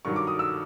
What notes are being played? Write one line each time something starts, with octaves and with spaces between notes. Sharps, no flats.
G2 D#3 F#3 C#6
D6
D#6
E6